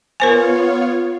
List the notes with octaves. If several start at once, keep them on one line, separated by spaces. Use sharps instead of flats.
B3 F4 A#4 C5 C#5 G#5